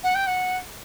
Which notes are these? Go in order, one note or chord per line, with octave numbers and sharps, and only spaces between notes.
F#5
G5
F#5